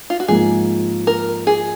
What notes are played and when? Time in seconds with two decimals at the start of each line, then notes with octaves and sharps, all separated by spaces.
0.10 F4
0.20 F#4
0.28 G#2 F3 A#3 G#4
1.07 A#4
1.47 G#4